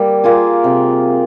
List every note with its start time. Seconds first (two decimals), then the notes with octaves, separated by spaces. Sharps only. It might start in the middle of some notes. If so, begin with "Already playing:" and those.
Already playing: G3 A#3
0.24 A#3 F4 G#4
0.64 C3